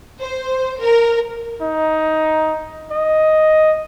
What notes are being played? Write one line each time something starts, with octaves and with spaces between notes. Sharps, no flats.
C5
A#4
D#4
D#5